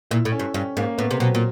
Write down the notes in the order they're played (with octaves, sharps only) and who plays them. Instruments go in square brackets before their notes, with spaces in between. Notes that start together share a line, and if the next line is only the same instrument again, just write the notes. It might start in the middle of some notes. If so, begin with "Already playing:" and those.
[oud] A#2 [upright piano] E4
[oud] A2
[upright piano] C#4
[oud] G2
[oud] G2 [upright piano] C#4
[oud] G#2 [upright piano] A#3
[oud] A2 [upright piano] B3
[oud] C3
[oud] B2 [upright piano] F#3
[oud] A#2